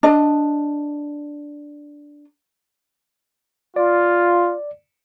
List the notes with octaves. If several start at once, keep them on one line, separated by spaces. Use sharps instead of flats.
D4 D#5
F4 D5